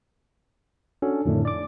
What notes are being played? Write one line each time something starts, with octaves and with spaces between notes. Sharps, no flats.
C#4 D4 F#4 A4
F2 A2 D3 D#3 A3 D4
D5 D6